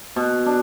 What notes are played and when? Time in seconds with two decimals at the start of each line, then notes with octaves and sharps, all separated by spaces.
0.16 B2
0.46 D4